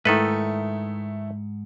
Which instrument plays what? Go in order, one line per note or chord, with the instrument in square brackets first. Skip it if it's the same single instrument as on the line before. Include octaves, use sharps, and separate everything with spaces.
[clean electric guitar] G#2 [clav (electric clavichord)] D#3 A4 B4 [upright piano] A3 E4